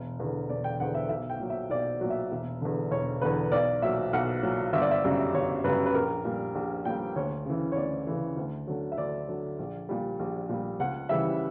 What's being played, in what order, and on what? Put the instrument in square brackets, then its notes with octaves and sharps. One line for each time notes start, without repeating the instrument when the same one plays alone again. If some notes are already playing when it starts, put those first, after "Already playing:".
Already playing: [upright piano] E1
E2 D3
E1 D5
G5
E2 D3 F#5
E5
B1 E5
G5
A#2 F#3
E5
B1 D5
A#2 F#3
E5
E1
E2 D3
E1 C#5
E2 D3 B4
B1 D5
A#2 F#3 E5
B1 F#5
A#2 F#3
G1 E5
D5
E5
F#2 C#3 G3
G1 C#5
F#2 C#3 G3 B4
B4
A#1 A#4
A#2 G3
A#1
A#2 G3 G5
D2 C#5
C#3 E3
C#5
D2 D5
C#3 E3
D2
D3 F#3
E5
D2 D5
D3 F#3
A#1
A#2 G3
A#1
A#2 G3
C#2 F#5
C#3 E3 G3 E5